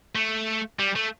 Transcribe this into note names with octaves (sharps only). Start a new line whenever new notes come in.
A3
G3
A3